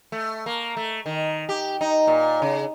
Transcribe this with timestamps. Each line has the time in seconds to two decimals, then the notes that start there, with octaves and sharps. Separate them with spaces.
0.12 A3
0.46 A#3
0.77 A3
1.06 D#3
1.49 G4
1.81 D#4
2.07 A#2
2.42 C#3